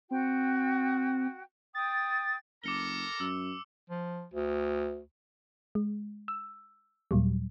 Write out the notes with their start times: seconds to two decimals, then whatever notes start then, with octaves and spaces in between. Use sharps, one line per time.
0.11 C4 F#4 G5
1.75 G5 D#6 A6
2.64 F#1 A4 A#4 A#5 D6 C#7 G7
3.20 F#2 E6
3.90 F3
4.34 D2
5.75 G#3
6.28 E6
7.11 D#2 A#2 F#3 G3